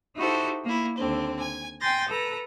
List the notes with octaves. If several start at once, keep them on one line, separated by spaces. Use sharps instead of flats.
D#4 E4 F#4 G4 A4 C5
A#3 E4
D#2 D3 C4
G#5 G#6
G5 G#5 C6 G6 A6 A#6
A4 B4 A#5